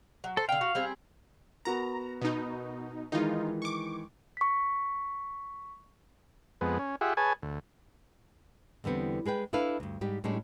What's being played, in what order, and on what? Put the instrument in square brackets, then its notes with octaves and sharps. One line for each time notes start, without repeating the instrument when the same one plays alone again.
[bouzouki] F#3
[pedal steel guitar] A4 [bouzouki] C5
[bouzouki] D3 G5 [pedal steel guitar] F5
[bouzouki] F#4
G3 C4 G#4
[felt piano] B3 F#4 A#4 [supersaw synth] A#5
[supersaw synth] B2 D#4
[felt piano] D#3 E3 G#3 [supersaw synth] D#4 F4
[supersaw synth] C#6 D6
[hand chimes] C#6 B6
[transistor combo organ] F2 G#3 B3
C#4
F4 G4 G#4 E5 F#5
G#4 B4 C#5 G#5 A5
D2
[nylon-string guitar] E2 D3 G3 B3 C4
G#3 G#4 B4 G5
D4 E4 A4 B4 F5
D2 G2
G#2 G3 G4
A2 G3 G#3 C#4 D4